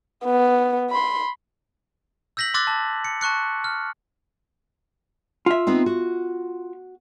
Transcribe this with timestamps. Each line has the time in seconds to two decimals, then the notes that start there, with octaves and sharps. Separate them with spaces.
0.25 B3
0.90 B5 C6
2.37 E6 G6 A#6 B6 F#7
2.54 C6 D6 E6 F#6 A6
2.67 A5
3.05 C#7
3.21 A5 C#6 F#6 C#7
3.64 F6
5.46 F4 E5
5.67 B3 C4 D#4
5.86 F#4